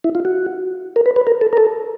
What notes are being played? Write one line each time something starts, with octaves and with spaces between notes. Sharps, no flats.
E4
F4
F#4
A#4
B4
B4
A#4
A4
A#4
A4